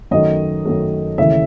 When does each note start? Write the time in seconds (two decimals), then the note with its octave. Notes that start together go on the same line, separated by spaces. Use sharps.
0.11 F#2 D#3 A3 D#5
0.65 F#2 D#3 A3
1.18 D#2 C#3 E3 A3 E5